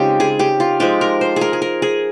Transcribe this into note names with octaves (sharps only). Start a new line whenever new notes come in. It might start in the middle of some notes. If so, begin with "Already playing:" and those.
Already playing: C#3 G#3 C4 D#4 F4 G4
G#4
G4
F4
F3 G#3 D#4 G4
A#4
C5
G#4 A#4
G#4
A#4
G#4